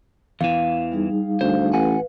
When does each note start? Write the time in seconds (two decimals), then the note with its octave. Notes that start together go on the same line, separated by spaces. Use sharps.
0.41 E2 E3 F5
0.92 G3 D#4 G#4
1.41 D2 C5
1.73 A1 B4 F#5 G#5